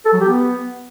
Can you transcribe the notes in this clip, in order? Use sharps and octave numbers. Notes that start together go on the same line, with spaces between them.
A4
F#3
G4
B3